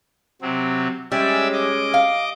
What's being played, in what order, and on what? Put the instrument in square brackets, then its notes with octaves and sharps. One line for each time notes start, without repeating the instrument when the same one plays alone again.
[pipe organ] C3 F#3 C4
[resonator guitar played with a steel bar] G3 [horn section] G#3 C#4 [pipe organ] D5 E5 E6
[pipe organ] D#5 D6
[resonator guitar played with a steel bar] F5